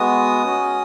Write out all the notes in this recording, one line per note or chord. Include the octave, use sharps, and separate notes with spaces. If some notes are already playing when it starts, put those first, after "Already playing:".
Already playing: G#3 B3 F#4 D#6
C#4 F#4